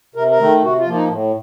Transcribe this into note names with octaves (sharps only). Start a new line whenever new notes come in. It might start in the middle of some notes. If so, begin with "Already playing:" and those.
C3 A#4
A#4
D#3 A3
C3 F#4
F4
F3 A#3
D#4
A2